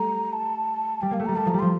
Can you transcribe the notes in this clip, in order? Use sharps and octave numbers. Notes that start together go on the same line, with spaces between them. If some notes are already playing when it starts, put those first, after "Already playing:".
Already playing: G3 A3 A#5
A5
G3 G5
A#3 F5
A3
G3 A#5
G3 A5
F3 A#5
G3
F3 C6